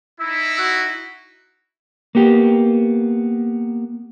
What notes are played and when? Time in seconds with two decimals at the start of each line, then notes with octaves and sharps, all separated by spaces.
0.20 D#4 E4 E6
0.59 F#4
2.15 A#3 B3 G4